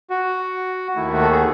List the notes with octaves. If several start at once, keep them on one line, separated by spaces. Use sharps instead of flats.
F#4
D#2 D#3 A3 E4
F#4
A4
G#4